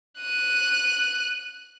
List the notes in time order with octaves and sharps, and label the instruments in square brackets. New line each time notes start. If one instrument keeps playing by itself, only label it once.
[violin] F#6 D#7